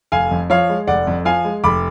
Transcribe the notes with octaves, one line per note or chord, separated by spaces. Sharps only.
F1 F5 G#5
F2
F3 C#5 F5
G#3
F1 D5 F#5
F2
F3 F5 G#5
G#3
F1 B5 D6